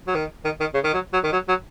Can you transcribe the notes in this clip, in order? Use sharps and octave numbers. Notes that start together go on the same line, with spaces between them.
F#3
D#3
D#3
D#3
C#3
D#3
F#3
F#3
D#3
F#3
F#3